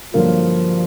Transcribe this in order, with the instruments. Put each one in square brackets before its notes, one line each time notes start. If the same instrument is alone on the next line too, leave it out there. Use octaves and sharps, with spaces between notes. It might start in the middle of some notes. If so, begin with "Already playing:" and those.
[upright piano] G2 D3 F#3 A#3 [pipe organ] F3